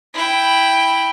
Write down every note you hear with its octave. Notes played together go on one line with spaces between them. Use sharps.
E4 G5